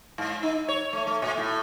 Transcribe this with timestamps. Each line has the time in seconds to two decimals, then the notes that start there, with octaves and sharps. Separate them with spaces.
0.18 G#2
0.43 D#4
0.68 C#5
0.93 A3
1.07 A3
1.22 A#2
1.37 A2